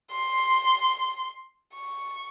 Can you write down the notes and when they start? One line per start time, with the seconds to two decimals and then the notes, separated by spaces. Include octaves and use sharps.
0.12 C6
1.75 C#6